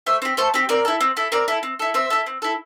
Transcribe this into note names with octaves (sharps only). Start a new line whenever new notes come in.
A3 C5 E5
C4 G4
A3 A4 C5
C4 G4
C4 A#4 D5
E4 A4
C4
E4 A4
C4 A#4 D5
E4 A4
C4
E4 A4
C4 C5 E5
E4 A4
C4
E4 A4